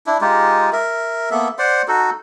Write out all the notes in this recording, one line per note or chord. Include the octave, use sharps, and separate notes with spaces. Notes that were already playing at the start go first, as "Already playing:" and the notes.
D4 E4
G#3 D#4 F4 G4
A#4 E5
A#3 B3 A4 E5
C5 D5 F#5 C6
D#4 F#4 A4